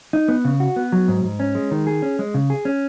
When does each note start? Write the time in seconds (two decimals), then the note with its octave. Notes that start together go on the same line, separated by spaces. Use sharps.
0.13 D#4
0.28 B3
0.45 C#3
0.60 F#4
0.76 B3
0.92 F#3
1.08 G#2
1.24 G#2
1.40 C#4
1.55 G#3
1.71 D#3
1.87 G#4
2.02 C#4
2.19 G#3
2.34 C#3
2.50 G#4
2.65 C#4